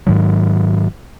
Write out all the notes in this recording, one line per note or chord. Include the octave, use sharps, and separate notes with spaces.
G#2 D#3 F#3